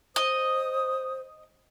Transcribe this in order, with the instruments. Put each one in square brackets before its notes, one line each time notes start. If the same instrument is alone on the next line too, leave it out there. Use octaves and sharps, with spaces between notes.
[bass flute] C5 [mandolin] D#5 [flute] D#6